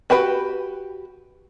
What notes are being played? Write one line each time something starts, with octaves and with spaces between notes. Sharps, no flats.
F#4 G4 B4 G5